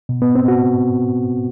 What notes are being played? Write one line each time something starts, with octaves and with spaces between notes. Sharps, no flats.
B2
B3
C4
F#4